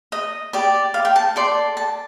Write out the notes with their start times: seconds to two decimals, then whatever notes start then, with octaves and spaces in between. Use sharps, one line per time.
0.12 D#5
0.53 G4 D5
0.94 F5
1.05 G5
1.16 A5
1.36 A4 D5 C6
1.77 A5